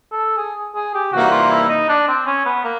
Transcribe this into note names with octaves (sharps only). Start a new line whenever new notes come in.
A4
G#4
G#4
G4
C3 E3 G3 A#3 D#4 F#4
F4
E4
D#4
D4
C4
C#4
B3
A#3